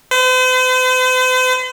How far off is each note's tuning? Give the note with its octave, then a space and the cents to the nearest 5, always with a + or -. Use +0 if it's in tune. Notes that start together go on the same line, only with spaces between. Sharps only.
C5 -45